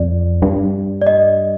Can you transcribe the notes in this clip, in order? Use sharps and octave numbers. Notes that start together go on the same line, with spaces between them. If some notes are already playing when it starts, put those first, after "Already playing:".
Already playing: F2 D5
G2
D5
D#5